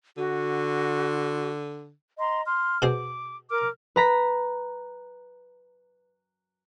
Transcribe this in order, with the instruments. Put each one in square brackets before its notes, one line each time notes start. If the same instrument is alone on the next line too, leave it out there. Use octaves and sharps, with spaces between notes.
[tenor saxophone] D3 [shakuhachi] F#4
[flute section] D#5 A#5 C6
C6 F6
[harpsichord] B2 G#4 C5 [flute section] D6
[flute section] A#4 D6 F6
[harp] B4 A#5 B6